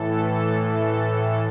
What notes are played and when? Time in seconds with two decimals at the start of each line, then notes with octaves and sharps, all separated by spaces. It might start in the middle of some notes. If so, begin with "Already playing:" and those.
Already playing: A2 E3 A4
0.65 A4